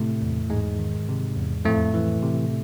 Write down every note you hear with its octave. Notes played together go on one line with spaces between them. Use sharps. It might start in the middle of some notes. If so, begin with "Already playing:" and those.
Already playing: A2 C3 A3
E2
E2 G#2 G#3
D#3
C3
E2
F2 A2 A3
E3
C3